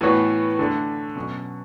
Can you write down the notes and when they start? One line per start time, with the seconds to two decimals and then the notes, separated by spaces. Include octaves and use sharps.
0.01 A2 E3 B3 F#4 C#5
0.59 D3 A3 D4
1.16 B2 F#3 C#4 F#4